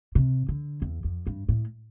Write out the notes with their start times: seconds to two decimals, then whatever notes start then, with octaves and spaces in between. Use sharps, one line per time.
0.15 C3
0.49 D3
0.82 E2
1.04 F2
1.27 G2
1.49 A2